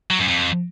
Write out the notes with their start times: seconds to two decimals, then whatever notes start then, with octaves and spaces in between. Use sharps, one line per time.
0.10 F#3
0.19 F#2
0.28 F2